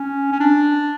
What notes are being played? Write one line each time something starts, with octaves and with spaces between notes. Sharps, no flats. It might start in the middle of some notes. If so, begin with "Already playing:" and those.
Already playing: C#4
C#4
D4